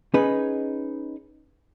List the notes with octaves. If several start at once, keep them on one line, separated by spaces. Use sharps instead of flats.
C#4 D#4 G#4 B4